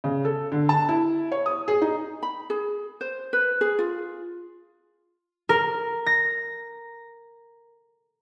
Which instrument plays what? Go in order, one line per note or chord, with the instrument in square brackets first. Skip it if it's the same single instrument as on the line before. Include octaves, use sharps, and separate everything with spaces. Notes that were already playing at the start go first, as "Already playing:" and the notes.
[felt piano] C#3
A4
D3
A5
E4
C#5
D#6
G#4
D#4
[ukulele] B5
G#4
C5
B4
G#4
F4
[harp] A#4
A#6